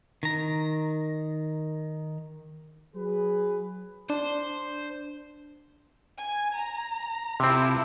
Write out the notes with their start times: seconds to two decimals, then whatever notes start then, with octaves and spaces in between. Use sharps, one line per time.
0.23 D#3 A#5
2.96 F#3 G#4 B4
4.10 D4 C5
6.19 G#5
6.56 A#5
7.40 C3 C4 E4 F4 A4